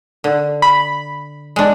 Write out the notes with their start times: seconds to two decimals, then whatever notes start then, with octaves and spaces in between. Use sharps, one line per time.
0.24 D3
0.62 B5
1.56 G#3 D4